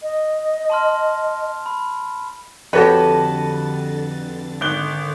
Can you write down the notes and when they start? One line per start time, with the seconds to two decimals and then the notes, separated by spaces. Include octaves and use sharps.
0.02 D#5
0.70 A5 C6 F6
1.66 B5
2.73 F2 D3 F#4 G4 A4 B4 C#5 A6
4.61 G#1 F#6 G7